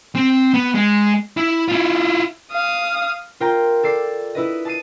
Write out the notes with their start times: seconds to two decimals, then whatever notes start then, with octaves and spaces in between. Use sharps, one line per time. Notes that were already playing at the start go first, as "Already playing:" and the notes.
0.16 C4
0.54 B3
0.75 G#3
1.37 E4
1.68 E4 F4
2.52 F5 D#6
3.40 F4 A#4 C5 G5 A#5
3.83 A4 D5 C7
4.35 E4 B4 D#5
4.65 A5 D#6 C7 D#7